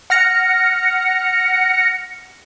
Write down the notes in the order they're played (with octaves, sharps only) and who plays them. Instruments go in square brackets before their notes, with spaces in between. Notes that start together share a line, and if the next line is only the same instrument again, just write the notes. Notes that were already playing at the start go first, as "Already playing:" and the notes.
[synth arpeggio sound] F#5 F6 A#6 C#7